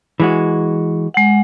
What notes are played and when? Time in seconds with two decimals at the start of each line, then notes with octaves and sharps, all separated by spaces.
0.20 E3 G#3 F#4
1.14 G#3 F#5